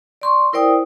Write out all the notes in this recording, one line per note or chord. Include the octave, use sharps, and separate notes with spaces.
D5 C6 C#6
E4 A#4 C5 D5 G5 D#6